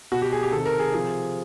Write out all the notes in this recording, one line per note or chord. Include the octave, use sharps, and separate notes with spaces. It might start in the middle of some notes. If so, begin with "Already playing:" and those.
B2 F#4
G4
G#4
G4
C3 D#3 A4
A#4
G#4
C3 F3